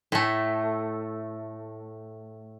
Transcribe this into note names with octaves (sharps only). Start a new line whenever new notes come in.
A2 A3